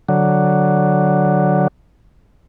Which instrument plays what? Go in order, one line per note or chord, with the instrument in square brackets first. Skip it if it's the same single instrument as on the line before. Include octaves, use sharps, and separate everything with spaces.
[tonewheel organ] D3 F#3